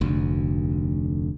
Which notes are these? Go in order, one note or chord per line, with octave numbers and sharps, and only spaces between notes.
F1 D2